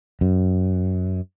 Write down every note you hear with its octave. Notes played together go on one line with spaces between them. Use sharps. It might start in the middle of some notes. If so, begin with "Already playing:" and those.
F#2